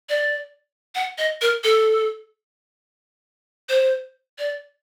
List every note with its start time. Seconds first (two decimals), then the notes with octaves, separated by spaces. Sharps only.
0.09 D5
0.95 F#5
1.18 D#5
1.42 A#4
1.64 A4
3.69 C5
4.39 D5